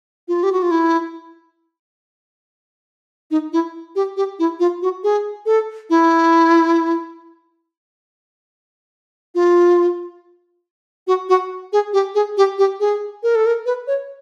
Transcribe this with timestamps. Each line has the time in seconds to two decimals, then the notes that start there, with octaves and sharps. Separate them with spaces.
0.28 F4
0.43 G4
0.52 F#4
0.62 F4
0.71 E4
3.31 D#4
3.53 E4
3.96 G4
4.17 G4
4.39 E4
4.59 F4
4.82 F#4
5.04 G#4
5.46 A4
5.90 E4
9.35 F4
11.07 F#4
11.29 F#4
11.73 G#4
11.93 G4
12.15 G#4
12.37 G4
12.58 G4
12.80 G#4
13.23 A#4
13.35 A4
13.46 A#4
13.66 B4
13.87 C#5